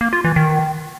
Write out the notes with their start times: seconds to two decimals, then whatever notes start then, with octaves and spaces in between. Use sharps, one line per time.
0.01 A#3
0.13 F4
0.24 E3
0.36 D#3